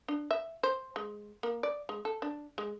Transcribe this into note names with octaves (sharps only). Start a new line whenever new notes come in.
D4
E5
C5
G#3
A#3
D5
G#3
A4
D4
G#3